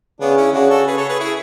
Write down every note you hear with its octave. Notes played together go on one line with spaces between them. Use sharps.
C#3 B3 D4
C#4 E4
C#3 D4 F#4
F#4 A4
G#4 B4
A4 C#5
G#4 B4
E4 G#4